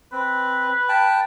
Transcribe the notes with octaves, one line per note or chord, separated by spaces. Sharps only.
C4 B4
G5 A5